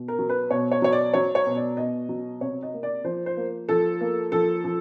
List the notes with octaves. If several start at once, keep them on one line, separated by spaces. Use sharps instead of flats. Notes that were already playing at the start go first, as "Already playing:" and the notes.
Already playing: B2
A#4
F#3
B4
B2 C#5
C#5
F#3 C#5
D5
F#3 C#5
C#5
B2
D5
B2 D#5
F#3
C3 C#5
D#5
A#3
D5
F3 C5
C5
A#3
F3 A4
A#3
F3 A4
F3